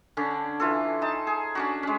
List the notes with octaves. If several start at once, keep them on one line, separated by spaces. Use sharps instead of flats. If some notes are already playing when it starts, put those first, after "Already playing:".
D3 C#4 D4
E3 F4 A4
D#4 A5
G#4
C#4 D4 F#4
G#3 C#4